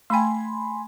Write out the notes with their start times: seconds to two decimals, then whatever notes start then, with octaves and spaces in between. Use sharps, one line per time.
0.10 A3 G5 G#5 B5 C6